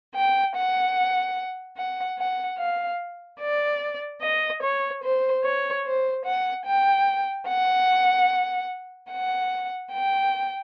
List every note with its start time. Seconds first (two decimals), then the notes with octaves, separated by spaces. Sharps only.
0.15 G5
0.55 F#5
1.77 F#5
2.18 F#5
2.59 F5
3.40 D5
4.22 D#5
4.63 C#5
5.02 C5
5.44 C#5
5.85 C5
6.25 F#5
6.65 G5
7.47 F#5
9.10 F#5
9.92 G5